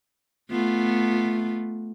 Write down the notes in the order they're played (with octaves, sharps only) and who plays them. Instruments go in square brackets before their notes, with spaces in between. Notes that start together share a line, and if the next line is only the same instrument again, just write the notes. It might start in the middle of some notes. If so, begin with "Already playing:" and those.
[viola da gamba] A3 B3 F4